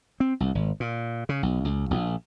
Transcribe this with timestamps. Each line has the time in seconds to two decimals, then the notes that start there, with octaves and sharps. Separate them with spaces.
0.20 C4
0.40 C2
0.55 G#1
0.80 A#2
1.29 C#3
1.43 B1
1.65 C#2
1.91 A#1